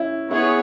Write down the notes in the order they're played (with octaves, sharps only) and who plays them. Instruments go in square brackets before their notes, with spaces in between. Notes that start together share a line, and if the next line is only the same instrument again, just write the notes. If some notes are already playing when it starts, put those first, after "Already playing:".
Already playing: [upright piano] C#4 E4
[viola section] B3 G#4 C#5 [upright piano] E4